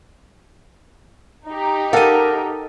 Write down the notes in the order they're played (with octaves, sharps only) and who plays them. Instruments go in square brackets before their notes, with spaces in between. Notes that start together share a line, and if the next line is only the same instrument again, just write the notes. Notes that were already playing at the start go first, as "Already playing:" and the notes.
[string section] D#4 G4
[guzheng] A4 D#5 [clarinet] A#4 [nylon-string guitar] F5 F#5